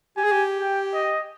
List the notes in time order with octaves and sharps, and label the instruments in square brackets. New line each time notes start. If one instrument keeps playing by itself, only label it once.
[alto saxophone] G4 [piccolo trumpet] G#5
[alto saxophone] G#4
G4
[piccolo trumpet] G5
D#5